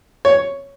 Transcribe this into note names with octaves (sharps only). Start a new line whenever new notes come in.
C#5